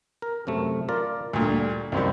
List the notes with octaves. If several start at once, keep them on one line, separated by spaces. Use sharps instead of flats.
A#4
F#2 C3 A3
F4 A#4 D5
D2 A#2 D3 G3
C2 F#2 D#3 G3 C4